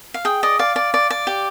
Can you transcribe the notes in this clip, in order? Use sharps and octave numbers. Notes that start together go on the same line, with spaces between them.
F5
G#4 G5
D5 D#5
D5 F5
D5
D5
D5
G4